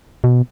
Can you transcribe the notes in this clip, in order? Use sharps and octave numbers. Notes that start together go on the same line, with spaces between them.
B2